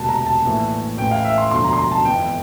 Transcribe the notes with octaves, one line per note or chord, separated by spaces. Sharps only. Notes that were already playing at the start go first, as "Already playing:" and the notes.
Already playing: E1 D2 C3 A5
A#5
A5
A#1 A2 E3
A1 A2 E3 G5
F5
E5
C6
E1 D2 D3 F3 C6
A#5
C6
A#5
A5
G1 F2 E3 G5